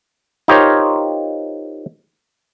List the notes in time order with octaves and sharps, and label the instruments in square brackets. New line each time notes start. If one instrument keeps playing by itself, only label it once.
[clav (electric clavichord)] D#4 F4 G4 A#4 C5 C#5